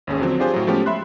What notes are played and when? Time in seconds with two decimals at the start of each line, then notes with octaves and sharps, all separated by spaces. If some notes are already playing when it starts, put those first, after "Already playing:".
0.07 G#1 D#2 C#4 G#4
0.20 D3 F3 F#3 C4
0.39 D4 F4 G4 G#4 C5 G#5
0.54 A2 F#3
0.67 F3 G#3 A3 B3 C#4 G4
0.86 E5 B5 C6 F#6